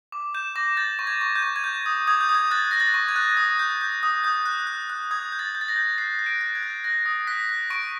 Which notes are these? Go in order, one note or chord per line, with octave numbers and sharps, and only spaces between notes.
D6
G6 E7
D6 A#6
G6 A6
C#6
G#6
C#6
G6
C#6
G#6
G6
D#6
D#6 G#6
G6
D#6
G#6
F#6 A6
F#6 A#6
A6
C#6
G#6
F#6
D#6
G6
G6
D#6
D#6 G6
F#6
F#6
F#6
D#6 G#6
G6
A6
G6
A6
A#6
G6
F#6 C7
F#6
D7
F#6
G#6
F#6
F#6 A#6
D#6
F#6 B6
F#6
C#6 D7